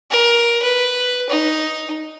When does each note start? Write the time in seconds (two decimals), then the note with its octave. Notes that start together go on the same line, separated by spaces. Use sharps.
0.11 A#4
0.62 B4
1.30 D#4